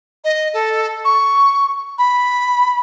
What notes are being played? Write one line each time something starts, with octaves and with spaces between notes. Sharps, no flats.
D#5
A4
C#6
B5